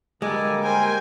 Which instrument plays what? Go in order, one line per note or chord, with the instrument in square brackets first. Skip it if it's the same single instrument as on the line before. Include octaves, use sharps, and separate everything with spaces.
[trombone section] D3 G3 A#3 [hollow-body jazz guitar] G#3 [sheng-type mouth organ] A4 G#5 D6
[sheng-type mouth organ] A#4 C5 G5 [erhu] G#5